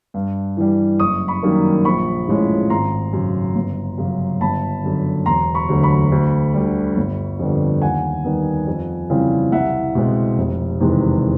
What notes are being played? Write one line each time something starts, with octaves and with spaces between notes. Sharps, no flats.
G2
E3 G3
F#1 C#6 D#6
B5 C#6
F#2 D#3 G3 A#3
A#1 B5 C#6
A2 F3 G#3 C#4
G#1 A#5 C6
F#2 C#3
G1
F#2 C#3 F#3
G1 A5 B5
F#2 D3
E1 A#5 C6
B5 C#6
D2 D3 F#3
B5 C#6
D2
D3 G3
G1
F2 D3 G3 B3
D#2 F#5 G#5
D#3 G3 B3
F2
C#3 E3 G3 C4
C2 E5 F#5
B2 G#3 C4
F1
E2 C3 D#3 G#3